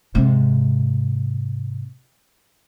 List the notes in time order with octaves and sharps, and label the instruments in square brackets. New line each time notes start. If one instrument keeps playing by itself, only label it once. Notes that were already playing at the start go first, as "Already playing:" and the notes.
[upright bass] G#2 C3